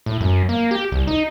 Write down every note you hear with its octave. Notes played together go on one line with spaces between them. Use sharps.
A2
F#2
A#3
G4
C2
D#4